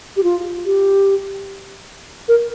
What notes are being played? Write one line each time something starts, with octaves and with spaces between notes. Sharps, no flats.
G4
F4
G4
A#4